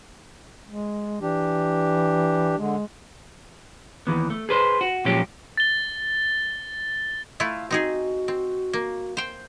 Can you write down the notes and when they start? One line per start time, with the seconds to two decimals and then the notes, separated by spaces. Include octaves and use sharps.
0.67 G#3
1.21 E3 D4 G4
2.58 D3 G#3
4.07 D#2 E3 B3
4.30 A3
4.49 G#4 B4 C5
4.81 F#4
5.05 A#2 F3 F#3 G#3 C#4 G4
5.57 A6 G7
7.40 A3 E4 F4 F5
7.71 C4 D#4 F#4 G#4
8.28 C4
8.73 A#3
9.17 C5 G5